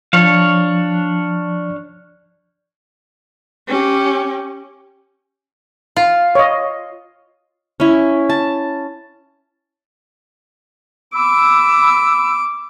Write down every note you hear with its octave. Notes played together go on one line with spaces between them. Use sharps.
F3 D4 C#5 F5
C#4 G4
F4
C#5 D#5
C#4 E4
A5
B5 D6 E6